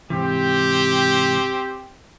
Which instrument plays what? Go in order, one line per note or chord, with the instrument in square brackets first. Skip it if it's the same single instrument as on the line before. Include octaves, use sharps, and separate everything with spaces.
[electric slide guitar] G#2 C3 E3 [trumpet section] C4 G4